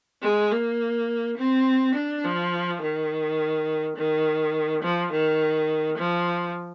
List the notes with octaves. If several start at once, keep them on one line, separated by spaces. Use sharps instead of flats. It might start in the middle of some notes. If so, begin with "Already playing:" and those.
G#3
A#3
C4
D4
F3
D#3
D#3
F3
D#3
F3